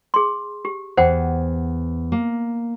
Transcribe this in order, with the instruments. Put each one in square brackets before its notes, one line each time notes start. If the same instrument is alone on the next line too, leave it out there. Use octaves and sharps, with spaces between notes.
[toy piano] G#4 C6
G4
[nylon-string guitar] E2 [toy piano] C5 F#5 G5
[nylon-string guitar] A#3